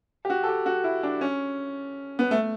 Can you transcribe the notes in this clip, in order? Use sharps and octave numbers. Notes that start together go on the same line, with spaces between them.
G4
F#4
A4
G4
F#4
E4
D4
C#4
B3
A3